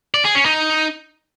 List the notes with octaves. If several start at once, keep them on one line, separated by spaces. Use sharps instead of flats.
D5
G#4
C#4
D#4